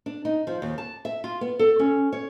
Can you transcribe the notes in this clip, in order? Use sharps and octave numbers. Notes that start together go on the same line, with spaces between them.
D4
D#4
F3
D#2
A5
E5
F4
B3
A4
C#4
C#5